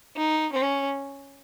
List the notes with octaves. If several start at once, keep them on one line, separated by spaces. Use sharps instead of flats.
D#4
C#4